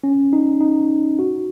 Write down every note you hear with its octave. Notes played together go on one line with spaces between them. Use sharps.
C#4
D#4
D#4
F#4